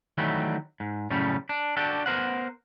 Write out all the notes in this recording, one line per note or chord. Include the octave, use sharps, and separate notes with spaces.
D#3 E3 F#3 G3 A3
G#2
F#2 A2 C#3 G3
D4
D4 F#4 G4 A4
B3 A#4 C5 F#5